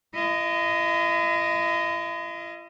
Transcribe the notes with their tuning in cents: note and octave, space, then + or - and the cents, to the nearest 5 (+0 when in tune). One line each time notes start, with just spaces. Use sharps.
E4 +45 D#5 +0